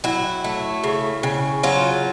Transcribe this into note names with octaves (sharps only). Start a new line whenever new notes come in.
F#3 E4
A3
C#3
C#3
F#3 F4